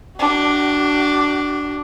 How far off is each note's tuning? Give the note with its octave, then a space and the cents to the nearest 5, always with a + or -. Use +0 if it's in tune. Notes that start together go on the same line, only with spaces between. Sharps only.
D4 +0 F#4 +35